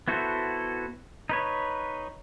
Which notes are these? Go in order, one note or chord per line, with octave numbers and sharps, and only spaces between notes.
B3 E4 F#4 A4 C5
D#4 B4 C#5